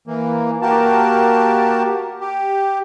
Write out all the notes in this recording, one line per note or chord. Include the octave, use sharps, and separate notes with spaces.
E3 A#3
A#3 F#4 G4 A#4 A5
G4